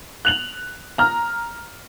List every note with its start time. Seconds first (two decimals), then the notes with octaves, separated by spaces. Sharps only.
0.25 F#6 F7 F#7
0.98 A#5 F6